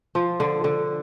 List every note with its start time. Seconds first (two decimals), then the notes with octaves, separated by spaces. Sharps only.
0.15 F3
0.40 D3
0.64 D3